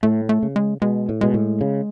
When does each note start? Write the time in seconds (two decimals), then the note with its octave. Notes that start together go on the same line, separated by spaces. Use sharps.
0.03 A2 A3
0.29 A3
0.43 C#3
0.56 G#3
0.82 B2 G#3
1.09 A2
1.21 B2 G#3
1.34 A2
1.61 C#3